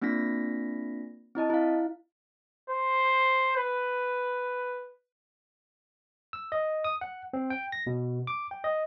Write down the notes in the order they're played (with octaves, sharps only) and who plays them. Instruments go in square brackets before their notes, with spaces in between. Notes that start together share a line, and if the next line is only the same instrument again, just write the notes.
[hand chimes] A#3 C4 D4 F4 A#6 B6
C4 E4 D#5 A5
E4 F5
[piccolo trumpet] C5
B4
[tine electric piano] E6
D#5
D#6
F#5
C4
G5
A#6
B2
D6
G5
D#5